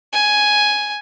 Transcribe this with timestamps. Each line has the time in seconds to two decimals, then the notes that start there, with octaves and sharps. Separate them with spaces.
0.13 G#5